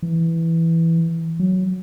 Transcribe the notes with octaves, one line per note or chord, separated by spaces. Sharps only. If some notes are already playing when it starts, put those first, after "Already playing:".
E3
F#3